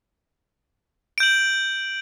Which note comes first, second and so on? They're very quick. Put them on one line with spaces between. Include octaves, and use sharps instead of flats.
D7 G6 F#7